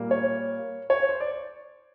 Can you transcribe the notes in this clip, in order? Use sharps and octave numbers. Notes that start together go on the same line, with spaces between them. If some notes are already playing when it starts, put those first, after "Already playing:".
Already playing: A#2 G3 A#3
C#5
C#5
C5
D5